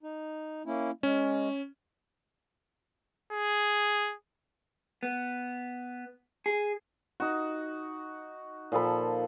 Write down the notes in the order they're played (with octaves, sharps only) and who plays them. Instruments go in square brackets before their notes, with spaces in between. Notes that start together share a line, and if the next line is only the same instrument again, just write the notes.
[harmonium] D#4
A#3 C#4 E4
[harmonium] G#3 [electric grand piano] C#4
[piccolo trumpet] G#4
[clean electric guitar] B3
G#4
[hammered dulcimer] D#4 F#4
A#2 F3 A4 B5